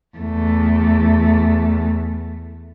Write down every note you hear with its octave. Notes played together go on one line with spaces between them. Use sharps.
E2 A3